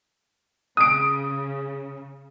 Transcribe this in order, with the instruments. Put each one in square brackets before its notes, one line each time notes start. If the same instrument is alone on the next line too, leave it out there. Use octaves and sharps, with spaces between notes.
[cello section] C#3 [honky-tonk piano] D#6 D7